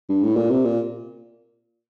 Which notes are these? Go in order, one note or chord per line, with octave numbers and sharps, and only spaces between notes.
G2
A2
A#2
C3
A#2